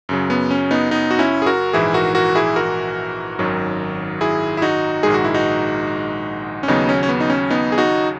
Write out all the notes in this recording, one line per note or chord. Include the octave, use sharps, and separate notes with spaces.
F#2 C#3 F#3
B3
C#4
B3 D#4
B3 D#4
F#4
C#4 E4
G#4
F#4 A#4
A#1 G#2 E3 E4 G#4
F#4 A#4
F#4 A#4
E4 G#4
F#4 A#4
G#1 F#2 D#3 F#3
E4 G#4
E4
D#4 F#4
A#1 G#2 D#3 G#3 G#4
F#4
E4
D#4 F#4
C#4
D#2 C#3 F#3 B3 D#4
C#4
C#4
B3
D#4
C#4
B3 D#4
G#4
D#4 F#4